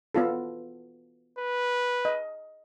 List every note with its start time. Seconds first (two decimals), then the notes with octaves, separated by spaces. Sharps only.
0.15 B3 F4 A4
1.39 B4
2.05 D#5